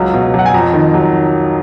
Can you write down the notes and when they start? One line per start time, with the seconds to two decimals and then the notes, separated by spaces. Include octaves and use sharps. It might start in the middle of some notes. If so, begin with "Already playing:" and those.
Already playing: C#2 F#3
0.14 B2
0.34 F#3 F#5
0.46 G#5
0.54 F2 A#5
0.73 D#3
0.94 F#3